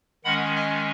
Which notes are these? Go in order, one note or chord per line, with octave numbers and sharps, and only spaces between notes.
D#3 G#3 C#4 F#5 B5
D#5 G#5